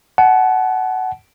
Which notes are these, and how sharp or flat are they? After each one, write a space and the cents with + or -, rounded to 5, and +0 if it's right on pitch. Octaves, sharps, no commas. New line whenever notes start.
F#5 +15 A5 -35